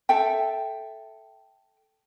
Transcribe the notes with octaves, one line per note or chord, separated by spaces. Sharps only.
A4 E5 G5